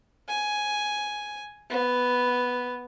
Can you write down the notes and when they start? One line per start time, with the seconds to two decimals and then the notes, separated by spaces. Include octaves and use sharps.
0.29 G#5
1.70 B3